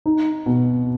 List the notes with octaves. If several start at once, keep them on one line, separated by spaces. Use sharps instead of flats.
D#4
B2